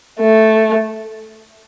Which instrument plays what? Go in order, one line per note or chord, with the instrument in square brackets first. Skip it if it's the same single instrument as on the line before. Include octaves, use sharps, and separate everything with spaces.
[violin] A3